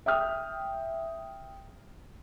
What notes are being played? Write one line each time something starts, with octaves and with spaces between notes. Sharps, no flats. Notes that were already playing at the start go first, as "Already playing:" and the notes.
E5 G5 D#6 F6